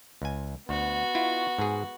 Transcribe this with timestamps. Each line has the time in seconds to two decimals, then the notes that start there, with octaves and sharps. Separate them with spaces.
0.22 C#2 G#5
0.69 D2 B3 F#4
1.15 E4 F4
1.59 G#2 G#4